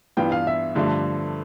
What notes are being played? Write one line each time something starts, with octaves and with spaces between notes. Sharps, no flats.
G2 E3 G3 B3 F4 G5
F5
E5
G2 D3 F3 A3